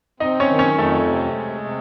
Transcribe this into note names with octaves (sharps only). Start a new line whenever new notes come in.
C3 D#4 D#5
C#4 C#5
D#3
C#4 C#5
F2 A3 A4
C3
G#3
C3